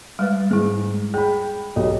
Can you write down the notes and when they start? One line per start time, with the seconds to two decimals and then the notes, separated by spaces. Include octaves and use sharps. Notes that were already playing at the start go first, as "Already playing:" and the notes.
0.19 G3 G#3 B4
0.51 G#2 E4 G#4
1.14 G#4 G5 B5
1.76 B1 G4 A4 D#5